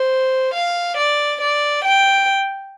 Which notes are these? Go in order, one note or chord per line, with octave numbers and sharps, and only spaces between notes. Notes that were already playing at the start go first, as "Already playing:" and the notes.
Already playing: C5
F5
D5
D5
G5